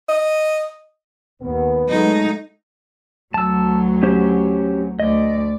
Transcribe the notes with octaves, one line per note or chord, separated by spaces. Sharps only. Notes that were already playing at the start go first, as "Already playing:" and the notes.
D#5
D#2 B3
F#3 G#3 A3 D#4
D2 F#3 A5 E6
C#4 G4 C5
D2 D5 D#5